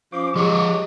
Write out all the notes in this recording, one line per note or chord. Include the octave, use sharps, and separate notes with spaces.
F3 C#4 D6
F3 G#3 G4 C#5